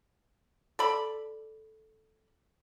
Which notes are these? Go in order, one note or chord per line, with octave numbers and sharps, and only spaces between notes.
A4 D5 B5